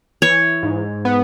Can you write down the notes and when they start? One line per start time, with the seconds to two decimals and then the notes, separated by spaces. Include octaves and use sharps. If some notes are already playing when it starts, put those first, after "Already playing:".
0.22 E3 C#5
0.63 G#2
1.05 B3